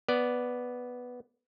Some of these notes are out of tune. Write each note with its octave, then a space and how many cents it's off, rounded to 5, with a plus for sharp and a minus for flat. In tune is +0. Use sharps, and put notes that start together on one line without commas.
B3 +0 D5 +0